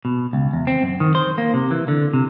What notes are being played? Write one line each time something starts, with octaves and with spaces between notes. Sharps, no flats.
B2
C#2
E2
C4
F#2
D#3
C5
A#3
C3
E3
D3
C3